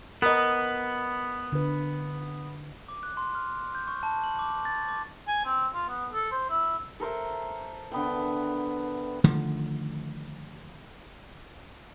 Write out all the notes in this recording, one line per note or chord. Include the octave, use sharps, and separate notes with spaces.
B3 A#4 D#5
D3 B4
D6
F#6
C6
F6
G6
C#6
A5
F#7
D6
A6
D6
G#5
C4
F4
B3
A4
C5
E4
A4 A#4 C5 E5
D3 B3 G5
D3 D#3 F3 A3